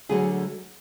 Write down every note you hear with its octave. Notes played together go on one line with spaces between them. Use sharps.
D2 D3 F#3 G#4